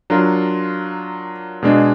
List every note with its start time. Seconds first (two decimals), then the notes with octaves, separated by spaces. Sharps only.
0.10 F#3 D4 F4 A#4
1.63 B2 G#3 D4